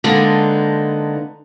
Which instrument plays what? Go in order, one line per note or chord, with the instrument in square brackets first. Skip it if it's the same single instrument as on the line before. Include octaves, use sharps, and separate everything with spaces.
[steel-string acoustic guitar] D3 G#3 A#3 B3 D4 D#4